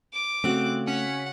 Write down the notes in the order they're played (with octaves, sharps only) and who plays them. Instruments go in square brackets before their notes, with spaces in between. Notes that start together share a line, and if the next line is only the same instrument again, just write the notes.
[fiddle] D6
[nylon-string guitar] C#3 F#4 [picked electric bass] A3 [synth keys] C4 F#6
[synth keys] C#4 B6 [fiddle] F#5